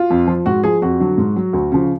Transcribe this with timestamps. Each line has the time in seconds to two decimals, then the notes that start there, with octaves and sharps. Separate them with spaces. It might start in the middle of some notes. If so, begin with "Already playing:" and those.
Already playing: F4
0.10 F2
0.27 F3
0.46 G#2 F#4
0.63 F3 G#4
0.82 F2 F#4
1.00 D3 F#3
1.18 G#2
1.36 F#3
1.53 D2
1.72 C#3 F3